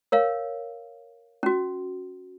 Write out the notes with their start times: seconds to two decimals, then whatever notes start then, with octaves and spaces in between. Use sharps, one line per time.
0.12 A#4 C#5 F5
1.43 C#4 F#4